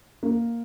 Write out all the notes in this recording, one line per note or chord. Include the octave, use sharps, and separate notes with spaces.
A#3